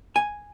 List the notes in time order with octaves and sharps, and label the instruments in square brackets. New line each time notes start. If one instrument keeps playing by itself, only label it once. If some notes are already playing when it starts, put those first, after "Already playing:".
[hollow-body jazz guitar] G#5